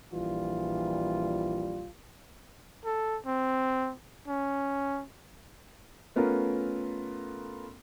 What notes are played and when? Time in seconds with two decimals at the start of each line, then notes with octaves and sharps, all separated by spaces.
0.13 A#1 E3 G3 F4
2.85 A4
3.26 C4
4.28 C#4
6.16 A3 B3 C#4 F4 A#4